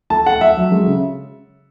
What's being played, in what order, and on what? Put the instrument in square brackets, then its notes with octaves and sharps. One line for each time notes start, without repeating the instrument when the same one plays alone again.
[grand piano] A3 A5
A3 F#5
A3 E5
F#3
G#3
C#3